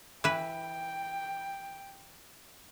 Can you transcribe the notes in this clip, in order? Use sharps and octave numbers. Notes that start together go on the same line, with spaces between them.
E3 B4 G5